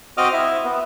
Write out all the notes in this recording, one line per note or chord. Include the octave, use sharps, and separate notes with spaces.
C4 F#4 D#5 D6 D#6 F6
E4 E5
B3